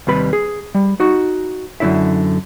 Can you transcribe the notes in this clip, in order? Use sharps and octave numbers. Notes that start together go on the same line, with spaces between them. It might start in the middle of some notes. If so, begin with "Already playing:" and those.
D#2 C3 G3 B4 B5
G#4
G3
D#4 F#4
F#2 A#2 D3 E4 E5